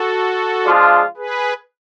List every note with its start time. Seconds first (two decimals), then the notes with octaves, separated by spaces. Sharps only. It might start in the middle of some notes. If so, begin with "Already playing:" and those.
Already playing: F#4 A4
0.66 F3 G#3 D4 F4
1.17 G#4 B4